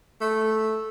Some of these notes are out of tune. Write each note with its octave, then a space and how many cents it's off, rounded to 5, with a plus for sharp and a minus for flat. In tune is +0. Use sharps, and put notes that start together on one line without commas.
A3 -5